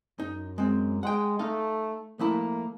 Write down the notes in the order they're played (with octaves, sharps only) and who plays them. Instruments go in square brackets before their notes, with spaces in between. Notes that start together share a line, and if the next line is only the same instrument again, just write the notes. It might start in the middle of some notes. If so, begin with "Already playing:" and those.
[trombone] F#2 [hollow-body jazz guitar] D#4
[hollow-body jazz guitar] G#3 C4
[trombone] G#3 [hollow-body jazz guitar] F#5 G5
[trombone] A3 [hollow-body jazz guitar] D#4 A4 F5
[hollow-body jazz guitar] F3 A3 E4 [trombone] A#3